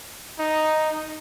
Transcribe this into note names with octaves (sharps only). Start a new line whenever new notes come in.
D#4